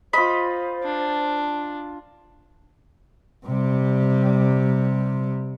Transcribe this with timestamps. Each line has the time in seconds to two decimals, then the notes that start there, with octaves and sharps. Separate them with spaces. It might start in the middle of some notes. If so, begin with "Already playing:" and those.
0.13 F4 C5 D#5 B5
0.83 D4
3.46 C3 G3